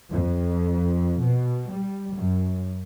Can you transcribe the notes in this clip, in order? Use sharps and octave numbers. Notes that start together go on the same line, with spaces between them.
F2
B2
G3
F#2